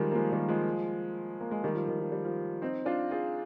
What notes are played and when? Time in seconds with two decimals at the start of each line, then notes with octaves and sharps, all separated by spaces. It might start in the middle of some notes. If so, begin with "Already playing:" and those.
Already playing: D#3 F3 G3 G#3
0.11 A#3
0.15 F3 G#3
0.32 D#3 G3
0.48 F3 G#3
1.40 A#3
1.51 G#3
1.64 D#3 G3
1.75 F3
1.88 D#3
2.00 F3
2.12 G3
2.25 F3
2.62 C4 D#4
2.86 D4 F4
3.11 F4 G#4